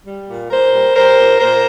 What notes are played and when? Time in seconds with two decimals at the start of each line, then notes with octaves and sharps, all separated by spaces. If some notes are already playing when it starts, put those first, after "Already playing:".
0.05 G3
0.28 A#2
0.49 A#2 A#4 C5
0.73 G3
0.95 G3 A#4 C5
1.17 A#2
1.39 A#2 A#4 C5